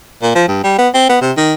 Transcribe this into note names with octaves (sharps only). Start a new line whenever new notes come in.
A#2
F3
G2
G3
B3
C4
B3
C3
D#3